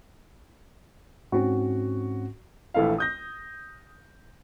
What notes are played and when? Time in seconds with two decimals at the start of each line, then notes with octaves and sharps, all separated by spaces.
1.32 G#2 C4 C#4 F#4
2.74 A#1 E3 A3 E4 F5
2.98 D#6 G6 A#6